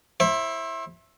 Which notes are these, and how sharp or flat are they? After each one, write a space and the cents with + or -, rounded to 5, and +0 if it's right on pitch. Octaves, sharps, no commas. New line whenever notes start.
E4 +0 C5 +40